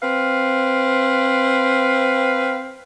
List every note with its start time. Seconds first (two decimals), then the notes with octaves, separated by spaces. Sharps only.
0.01 C4 B4 F5